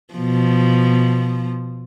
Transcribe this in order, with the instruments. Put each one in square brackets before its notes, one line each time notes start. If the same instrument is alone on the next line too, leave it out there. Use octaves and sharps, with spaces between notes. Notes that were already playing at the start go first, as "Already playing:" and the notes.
[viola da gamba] B2 F3